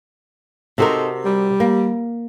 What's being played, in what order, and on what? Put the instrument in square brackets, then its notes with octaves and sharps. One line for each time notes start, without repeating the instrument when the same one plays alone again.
[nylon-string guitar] C3 F#4 A#4 [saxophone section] C4 D#4 A4
[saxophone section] G3
[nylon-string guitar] A#3